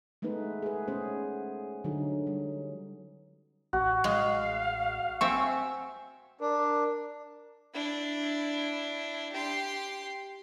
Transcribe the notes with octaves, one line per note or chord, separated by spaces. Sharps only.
G#3 A3 B3 D#4 B4
G#4 B4
A3 B3 C#4 G#4 C5
D3 F#3 D#4
G3
A1 F#4
G#3 F5
C4 E5 G#5 C#6 E6
D4 A#4
D4 E4
G4 C6